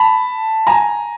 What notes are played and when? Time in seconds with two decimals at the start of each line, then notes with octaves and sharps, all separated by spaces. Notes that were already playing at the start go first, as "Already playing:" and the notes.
Already playing: A5 B5
0.67 G#5 A#5